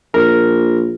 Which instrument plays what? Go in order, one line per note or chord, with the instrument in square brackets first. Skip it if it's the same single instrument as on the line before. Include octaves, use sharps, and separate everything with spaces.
[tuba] A#1 [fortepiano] A#4